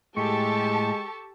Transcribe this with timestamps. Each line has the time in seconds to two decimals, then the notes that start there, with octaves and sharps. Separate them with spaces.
0.17 A2 G#3 G4 A4 A5 C#6